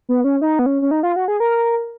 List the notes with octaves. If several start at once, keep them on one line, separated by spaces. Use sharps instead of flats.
B3
C#4
D#4
B3
C#4
C#4
D#4
F4
F#4
G#4
A#4